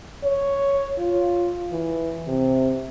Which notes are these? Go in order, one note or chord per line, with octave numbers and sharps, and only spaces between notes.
C#5
F4
E3
C3